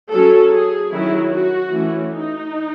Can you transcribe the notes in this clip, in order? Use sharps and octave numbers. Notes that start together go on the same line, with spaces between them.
F#3 C#4 A4
G#4
D#3 F#3 C#4 E4
F#4
E3 A3 C#4
D#4